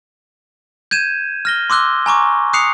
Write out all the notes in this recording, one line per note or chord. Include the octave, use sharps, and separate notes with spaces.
G6 G#6 D#7 E7
F6 A#6 G7
C6 D6 E6 F#6 G7
G#5 A#5 C#6 D6
D#6 F#6 C7 C#7 F7